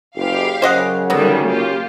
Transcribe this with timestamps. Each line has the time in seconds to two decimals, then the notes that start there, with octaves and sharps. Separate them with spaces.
0.16 F#1 G4 F5
0.62 F#2 C#3 C5 D#5 F#5
1.10 D3 D#3 F#3 G3 B3
1.47 A#3 F4 G4